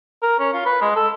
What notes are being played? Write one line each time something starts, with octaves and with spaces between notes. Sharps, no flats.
A#4
C#4
F4
B4
G#3
A4